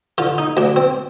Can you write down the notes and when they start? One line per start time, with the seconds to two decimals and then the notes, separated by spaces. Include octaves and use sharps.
0.18 D3 F4
0.38 D#4
0.57 D2 D4
0.76 C4